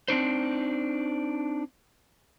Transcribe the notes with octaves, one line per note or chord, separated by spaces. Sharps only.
C4 D4 D#4 C5